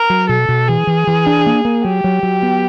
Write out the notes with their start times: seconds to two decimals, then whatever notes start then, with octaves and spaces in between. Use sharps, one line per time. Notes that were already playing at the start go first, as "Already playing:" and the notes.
Already playing: A#4
0.10 F#3
0.29 B2 A4
0.49 B2
0.68 E3 G#4
0.87 E3
1.07 E3
1.26 D4
1.46 A#3
1.65 A#3
1.84 F#3 G4
2.04 F#3
2.23 F#3
2.42 B3